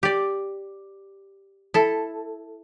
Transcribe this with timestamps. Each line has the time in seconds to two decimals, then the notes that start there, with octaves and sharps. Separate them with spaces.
0.03 G4 D5
1.74 E4 A4